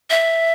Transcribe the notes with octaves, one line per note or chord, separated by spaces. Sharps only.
E5